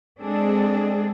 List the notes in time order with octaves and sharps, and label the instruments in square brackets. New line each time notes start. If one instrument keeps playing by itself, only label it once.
[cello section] G#3 C4 D4 G#4 A4